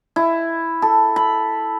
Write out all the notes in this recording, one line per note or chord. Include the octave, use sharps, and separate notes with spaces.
E4
A4
B5